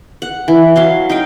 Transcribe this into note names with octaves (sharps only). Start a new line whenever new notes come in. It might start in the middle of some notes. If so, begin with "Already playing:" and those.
F#5
E3
F#3 F5 C6
D#4 F5 G5